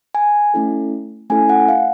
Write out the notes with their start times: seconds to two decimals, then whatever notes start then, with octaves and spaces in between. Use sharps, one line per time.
0.15 G#5
0.54 A3 C#4 E4 A4
1.30 A3 C#4 E4 A4 G#5
1.49 F#5
1.68 F5